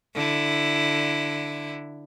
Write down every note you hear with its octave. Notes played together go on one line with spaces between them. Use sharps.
D3 E4